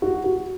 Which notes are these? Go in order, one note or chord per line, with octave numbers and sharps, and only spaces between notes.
F#4
F#4